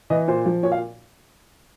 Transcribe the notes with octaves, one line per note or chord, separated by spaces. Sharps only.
E3 D#5
A#2 C5
F3
A#2 C#5
F5